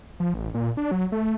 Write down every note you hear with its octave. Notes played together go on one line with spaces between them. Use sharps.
F3
A1
A#2
D4
F#3
A3